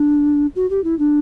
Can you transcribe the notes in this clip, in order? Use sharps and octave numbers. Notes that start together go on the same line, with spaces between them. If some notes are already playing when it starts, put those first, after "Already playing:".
Already playing: D4
F#4
G4
E4
D4